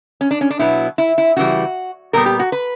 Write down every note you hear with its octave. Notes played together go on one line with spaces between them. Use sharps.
C#4
D4
C#4
D4
B2 F#3 B3 E4
E4
E4
C#3 E3 G3 F#4
A#2 G3 B3 A#4
G4
F#4
B4